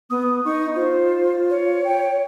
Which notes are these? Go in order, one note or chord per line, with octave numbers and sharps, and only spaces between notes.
B3 D#6
D#4 C#6
F4 C5
C#5
G5